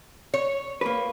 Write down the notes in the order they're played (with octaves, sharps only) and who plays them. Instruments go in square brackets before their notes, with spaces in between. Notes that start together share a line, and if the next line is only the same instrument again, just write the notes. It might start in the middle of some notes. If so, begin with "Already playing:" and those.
[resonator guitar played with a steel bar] C#5
[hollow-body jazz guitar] A#3 B4